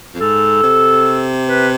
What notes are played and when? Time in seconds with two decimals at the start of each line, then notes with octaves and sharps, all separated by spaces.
0.14 F2
0.21 G#2 A4
0.63 C3
1.49 B4